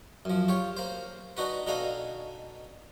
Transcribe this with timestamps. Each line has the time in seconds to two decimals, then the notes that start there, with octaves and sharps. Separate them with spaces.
0.25 F#2 F3
0.48 F4 G4 C#5
0.77 A#3 C5
1.37 D4 D#4 F#4 B4
1.67 B2 D4 D#4 A4 F5 G#5